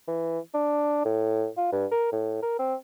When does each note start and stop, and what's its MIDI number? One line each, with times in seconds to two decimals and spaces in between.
0.07 0.39 52
0.54 1.03 62
1.05 1.47 45
1.57 1.71 65
1.72 1.86 43
1.91 2.07 70
2.12 2.41 45
2.42 2.56 70
2.59 2.75 60